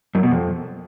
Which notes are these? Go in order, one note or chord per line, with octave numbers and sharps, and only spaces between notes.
F#2
B2
F2